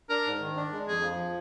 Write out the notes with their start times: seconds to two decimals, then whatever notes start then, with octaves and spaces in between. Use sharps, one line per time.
0.10 D4 A#4
0.26 G#2
0.41 D#3
0.56 D4
0.72 G#3
0.87 F2 G#4
1.02 F3